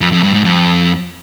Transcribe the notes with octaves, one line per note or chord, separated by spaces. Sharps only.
F2
F2
G2
G#2
F2